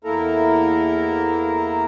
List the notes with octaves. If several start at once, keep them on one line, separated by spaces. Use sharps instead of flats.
E2 A#3 E4 A4 A#4 A#5